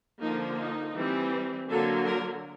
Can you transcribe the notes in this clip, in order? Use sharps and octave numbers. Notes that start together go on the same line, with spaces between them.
D3 F3 A#3 D#4
D#4
E3 G3 C4
D3 F#3 A#3 A4
A#4